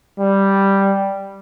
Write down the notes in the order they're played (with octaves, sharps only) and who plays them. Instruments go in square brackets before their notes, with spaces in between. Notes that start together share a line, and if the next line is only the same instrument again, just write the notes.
[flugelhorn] G3